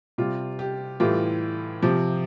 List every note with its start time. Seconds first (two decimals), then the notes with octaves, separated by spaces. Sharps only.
0.18 C3 G3 F4
0.59 G4
1.00 A2 E3 G3 F4
1.82 C3 F3